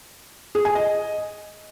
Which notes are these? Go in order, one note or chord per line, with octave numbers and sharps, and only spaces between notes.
G#4
G#5
D#5